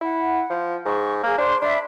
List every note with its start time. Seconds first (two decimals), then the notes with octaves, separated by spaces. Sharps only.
0.01 E4 F#5
0.50 F3
0.86 G#2 C#6
1.23 A#3 G#4
1.38 D4 C5 C6
1.62 D4 D5 E5 B5